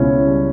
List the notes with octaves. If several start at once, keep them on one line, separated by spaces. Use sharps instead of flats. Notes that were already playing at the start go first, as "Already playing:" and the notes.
Already playing: C#2 B2 C#4 E4
G3